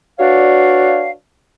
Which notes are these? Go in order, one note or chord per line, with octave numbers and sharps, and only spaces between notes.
D4 F#4 B4 C#5 D5 F5